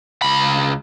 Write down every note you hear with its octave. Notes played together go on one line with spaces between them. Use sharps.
C#2 B5